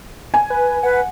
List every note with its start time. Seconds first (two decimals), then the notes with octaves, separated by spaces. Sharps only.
0.34 G#5
0.50 B4
0.83 B4 F#5